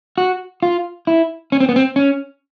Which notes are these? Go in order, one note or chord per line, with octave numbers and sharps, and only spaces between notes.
F#4
F4
E4
C#4
C4
B3
C4
C#4